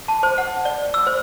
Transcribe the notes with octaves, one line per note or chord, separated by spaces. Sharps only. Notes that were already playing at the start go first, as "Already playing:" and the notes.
A5
C5
F#5
D5
E6
C5